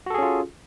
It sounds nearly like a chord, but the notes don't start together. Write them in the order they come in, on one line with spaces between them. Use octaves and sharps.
F#4 A4 G#4 C#4 F4